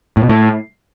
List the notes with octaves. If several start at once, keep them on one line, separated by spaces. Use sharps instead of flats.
A2
B2
A2